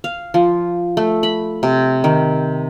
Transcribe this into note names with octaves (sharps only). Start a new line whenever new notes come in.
F5
F3
A3
B5
C3
D#3